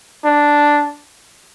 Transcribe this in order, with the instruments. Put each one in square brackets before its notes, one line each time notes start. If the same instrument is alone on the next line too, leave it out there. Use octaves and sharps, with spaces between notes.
[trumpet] D4